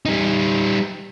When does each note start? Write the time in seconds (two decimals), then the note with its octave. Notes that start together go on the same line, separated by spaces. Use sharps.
0.06 G3 D#4